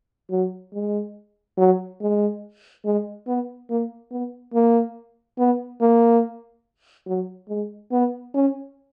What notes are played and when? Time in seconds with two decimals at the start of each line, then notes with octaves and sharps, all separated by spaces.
0.31 F#3
0.73 G#3
1.57 F#3
2.01 G#3
2.85 G#3
3.27 B3
3.70 A#3
4.11 B3
4.54 A#3
5.39 B3
5.81 A#3
7.07 F#3
7.49 G#3
7.92 B3
8.34 C#4